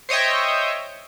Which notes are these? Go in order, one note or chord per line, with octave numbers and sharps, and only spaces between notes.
C5 C#5 D#5 E5 G5